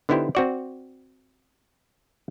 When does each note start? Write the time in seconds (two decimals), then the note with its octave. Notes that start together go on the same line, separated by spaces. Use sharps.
0.09 D3 B3 D#4 E4 G4 C5
0.35 C4 F#4 D5